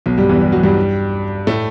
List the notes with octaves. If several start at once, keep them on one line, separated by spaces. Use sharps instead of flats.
B1 B2
G2 G3
E2 E3
G3
F#3
G2 G3
A2 A3